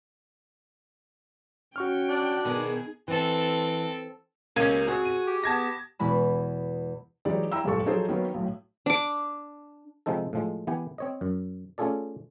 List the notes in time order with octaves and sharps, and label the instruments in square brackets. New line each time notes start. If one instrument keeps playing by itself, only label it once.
[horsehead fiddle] C#4 G5 [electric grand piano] F#4 C#6 F6
[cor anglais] D4
[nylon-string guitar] B2 D#3 B3 [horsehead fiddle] D#4 G#4
[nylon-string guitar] E3 [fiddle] C4 A4
[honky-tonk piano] C#2 G#6 D#7 [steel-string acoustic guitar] A#3 G4 [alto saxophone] C#4
[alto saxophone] C4 [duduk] F#4 [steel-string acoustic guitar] G#4
[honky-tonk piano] D#7
[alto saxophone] G4
[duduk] B3 [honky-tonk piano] A5 G#6 A#6
[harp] E2 B2 G#3 B5 E7
[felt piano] E3 F#3 G#3 D#4 G4 D5
E4 G5 A#5 E6
F#1 C#2 G2 A#2 A4 C#6
F3 F#3 D#4 G#4 A4 C5
D#3 F#3 A#3 B3
B1 A2
[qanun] D4 D6
[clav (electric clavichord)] C3 F3 G#3 C4 D#4 A4
A2 F3 G#3
E3 B3 G4 G#5
C4 C#5 D#5
F#2
A3 C#4 F4 G#4 A4 D5